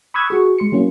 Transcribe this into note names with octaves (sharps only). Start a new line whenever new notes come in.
B5 C#6 D#6 E6 F#6 G#6
F#4 G#4 C#6
G#3 C6 C#7
F#3 A#3 C#4 E4